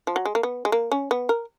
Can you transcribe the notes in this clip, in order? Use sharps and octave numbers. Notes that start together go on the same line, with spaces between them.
F3
F#3
G#3
A#3
B3
G#3
A#3
C#4
B3
A#4